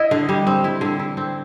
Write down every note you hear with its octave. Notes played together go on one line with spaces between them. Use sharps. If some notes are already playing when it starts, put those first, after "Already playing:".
Already playing: E4 D#5
D3
G3
C4
E4
D3
E4
C4